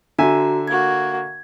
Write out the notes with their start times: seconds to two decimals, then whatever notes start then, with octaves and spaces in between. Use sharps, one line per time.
0.19 D3 F#4 E5 G#5 A#5
0.68 A#3 F#4 G#6